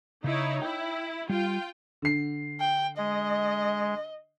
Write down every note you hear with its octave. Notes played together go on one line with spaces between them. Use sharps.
C#3 D#4 E4 C#5
E4 G5
G3 F4 G5
D3 C7
G5
G#3 D#5